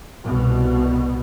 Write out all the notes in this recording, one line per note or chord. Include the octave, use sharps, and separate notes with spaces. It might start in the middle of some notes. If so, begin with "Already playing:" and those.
C2 B2